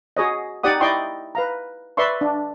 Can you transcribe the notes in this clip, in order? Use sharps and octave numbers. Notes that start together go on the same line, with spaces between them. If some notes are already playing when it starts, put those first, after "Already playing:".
F#4 G#4 C#5 D#5
D#4 G4 D5 F#5 D#6
E4 D5 D#5 G5 C6 C#6
B4 F5 A#5
B4 D5 E5 C6 C#6
D4